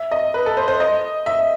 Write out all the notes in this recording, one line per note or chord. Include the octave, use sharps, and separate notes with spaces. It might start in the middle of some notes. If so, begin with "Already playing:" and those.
Already playing: E5
D#5
B4
A4
C5
C5
D#5
E5